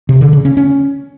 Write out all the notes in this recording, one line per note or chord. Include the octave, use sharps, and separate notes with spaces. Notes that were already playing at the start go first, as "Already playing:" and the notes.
C3
D3
C#3
C#4
C#4